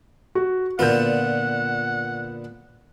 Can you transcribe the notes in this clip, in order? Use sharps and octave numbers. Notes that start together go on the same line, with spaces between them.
F#4
A#2 D3 B3 F4 F#5 G6